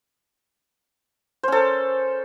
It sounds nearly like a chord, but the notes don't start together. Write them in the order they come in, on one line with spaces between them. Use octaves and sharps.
C5 C#4 A4 A#4